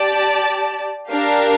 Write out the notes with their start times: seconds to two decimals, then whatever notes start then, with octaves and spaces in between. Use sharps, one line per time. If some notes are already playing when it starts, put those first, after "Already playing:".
Already playing: G4 D5 A5
1.10 D4 G4 A#4 F5